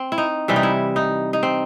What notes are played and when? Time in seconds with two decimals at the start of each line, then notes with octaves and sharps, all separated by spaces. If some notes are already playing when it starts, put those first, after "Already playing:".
Already playing: C4
0.12 E4
0.18 D#4
0.48 C3 E3 G3 E4
0.56 D#4
0.63 E4
0.96 D#4
1.33 D#4
1.43 C4